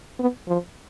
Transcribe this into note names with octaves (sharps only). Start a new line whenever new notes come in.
B3
F3